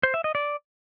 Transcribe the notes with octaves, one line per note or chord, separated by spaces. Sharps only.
C5
E5
D#5
D5